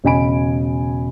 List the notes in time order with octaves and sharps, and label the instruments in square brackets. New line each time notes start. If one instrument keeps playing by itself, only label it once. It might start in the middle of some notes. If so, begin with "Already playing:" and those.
[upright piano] E1 C#3 D#5 G#5 B5 D7